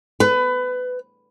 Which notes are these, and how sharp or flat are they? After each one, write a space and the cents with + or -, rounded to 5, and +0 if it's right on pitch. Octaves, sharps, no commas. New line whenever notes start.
B4 +25